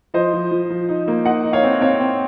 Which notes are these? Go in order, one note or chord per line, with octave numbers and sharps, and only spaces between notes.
F3 C5 D#5
F3
F3
F3
D#4
A#3
D#4 D#5 F#5
D#4
C#5 F5
C4
C4 C#5 F5
C4